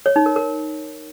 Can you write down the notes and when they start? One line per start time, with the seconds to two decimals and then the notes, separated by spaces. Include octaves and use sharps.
0.06 C#5
0.16 D#4
0.26 A#4
0.36 A#4